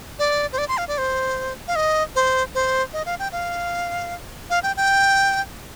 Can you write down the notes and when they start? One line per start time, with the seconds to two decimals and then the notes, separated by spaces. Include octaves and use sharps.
0.19 D5
0.53 C5
0.58 D5
0.68 C6
0.78 F5
0.88 D5
0.98 C5
1.68 F5
1.76 D#5
2.15 C5
2.55 C5
2.93 D#5
3.06 F5
3.19 G5
3.32 F5
4.50 F5
4.63 G5
4.77 G5